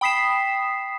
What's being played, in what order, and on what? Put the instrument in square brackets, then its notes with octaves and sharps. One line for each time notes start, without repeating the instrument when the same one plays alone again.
[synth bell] G5 B5 D#6 B6 C7 E7